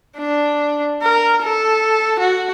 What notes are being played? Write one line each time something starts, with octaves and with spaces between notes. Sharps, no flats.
D4
A#4
A4
F#4